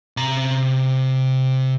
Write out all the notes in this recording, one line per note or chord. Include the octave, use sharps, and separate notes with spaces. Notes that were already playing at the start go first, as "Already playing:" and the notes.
C3 A#5